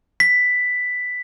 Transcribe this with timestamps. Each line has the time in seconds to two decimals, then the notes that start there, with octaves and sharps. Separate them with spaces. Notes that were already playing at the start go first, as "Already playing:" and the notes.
0.20 B6